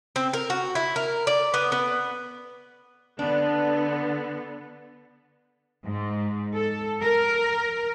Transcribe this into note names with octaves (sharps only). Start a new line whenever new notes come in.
C4
A#4
F#4
E4
A#4
D5
B3
B3
D3 B3 D4
G#2
A4
A#4